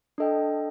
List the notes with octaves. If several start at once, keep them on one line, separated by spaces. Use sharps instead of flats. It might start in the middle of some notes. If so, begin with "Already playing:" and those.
D4 A4 D#5 G5